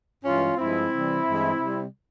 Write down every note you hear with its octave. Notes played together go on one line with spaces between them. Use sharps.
G2 E3 G#3 C#4 F4
G2 F3 G#3 C4 E4
C3 E3 G3
G2 E3 G#3
C3 G3